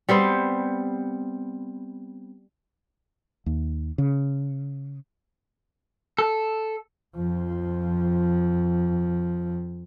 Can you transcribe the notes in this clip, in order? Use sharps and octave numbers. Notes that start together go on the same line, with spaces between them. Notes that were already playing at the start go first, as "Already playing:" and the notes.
G3 B3 C4 C5
D#2
C#3
A4
F2 F3